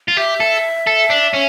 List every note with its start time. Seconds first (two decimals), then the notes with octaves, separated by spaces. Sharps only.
0.08 F4
0.17 G4 E5
0.40 A4
0.87 A4
1.10 D4
1.34 C#4